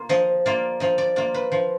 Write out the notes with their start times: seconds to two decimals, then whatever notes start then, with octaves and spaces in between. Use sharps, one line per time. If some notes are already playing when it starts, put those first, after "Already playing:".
Already playing: A#3 F4
0.09 F3 D#5
0.46 A#3 F4 D5
0.80 F3 D#5
0.98 D5
1.16 A#3 F4 D5
1.34 B4
1.52 F3